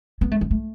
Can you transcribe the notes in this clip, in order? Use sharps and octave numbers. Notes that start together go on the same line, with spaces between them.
B3
A3
G#3
A3